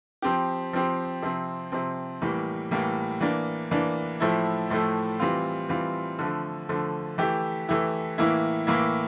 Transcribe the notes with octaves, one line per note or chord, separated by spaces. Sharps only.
F3 C4 G4
F3 C4 G4
C3 F3 C4
C3 F3 C4
A2 E3 G3 A#3
A2 E3 G3 A#3
E3 A#3 D4
E3 A#3 D4
A2 F3 A3 E4
A2 F3 A3 E4
E3 G3 C4 F4
E3 G3 C4 F4
D3 F3 A3
D3 F3 A3
E3 A3 E4 G4
E3 A3 E4 G4
A2 E3 A#3 E4
A2 E3 A#3 E4